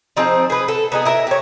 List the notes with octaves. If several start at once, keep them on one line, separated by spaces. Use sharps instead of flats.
F3 C4 D#4 G#4
G#4 B4
A4
B3 D#4 G#4
E4 A#4 E5
G4 C#5